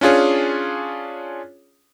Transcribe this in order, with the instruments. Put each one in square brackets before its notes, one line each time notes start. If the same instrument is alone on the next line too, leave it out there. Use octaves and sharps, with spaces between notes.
[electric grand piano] C#4 D4 F4 G#4 C#5